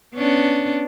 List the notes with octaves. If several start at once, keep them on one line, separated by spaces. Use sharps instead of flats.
B3 C#4 D4